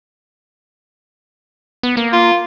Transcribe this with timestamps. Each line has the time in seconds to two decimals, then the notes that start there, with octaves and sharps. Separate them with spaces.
1.83 B3
1.97 A#3
2.13 F4